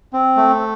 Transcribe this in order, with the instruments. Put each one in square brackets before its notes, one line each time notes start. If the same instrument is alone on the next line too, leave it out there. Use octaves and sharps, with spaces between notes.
[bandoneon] C4
A3